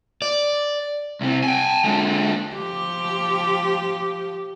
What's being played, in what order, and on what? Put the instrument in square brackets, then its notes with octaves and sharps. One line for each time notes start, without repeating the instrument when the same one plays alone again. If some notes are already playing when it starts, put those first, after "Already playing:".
[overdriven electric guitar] D5
[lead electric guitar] C2 C3
G5 G#5
D3 G#3
[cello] F3 G4